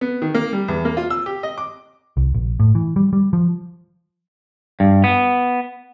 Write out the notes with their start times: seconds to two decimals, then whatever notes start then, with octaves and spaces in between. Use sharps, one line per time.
0.01 B3
0.22 D#3
0.34 A#3
0.53 G3
0.68 E2
0.85 A#3
0.97 F4
1.10 E6
1.26 G4
1.43 D#5
1.58 D6
2.17 C2
2.34 A#1
2.60 A2
2.75 E3
2.96 G3
3.13 G3
3.33 F3
4.80 G2
5.04 B3